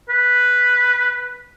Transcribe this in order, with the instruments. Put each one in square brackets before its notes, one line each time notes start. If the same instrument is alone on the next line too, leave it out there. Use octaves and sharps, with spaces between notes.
[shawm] B4